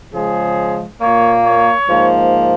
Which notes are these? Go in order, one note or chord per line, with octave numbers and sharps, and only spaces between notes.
C#3 F3 G#3 G#4
A#2 A#3 C#5
C#5
G#2 F3 A#3